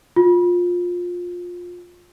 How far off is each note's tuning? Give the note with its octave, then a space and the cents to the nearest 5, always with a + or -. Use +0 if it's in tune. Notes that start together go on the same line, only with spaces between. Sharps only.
F4 +20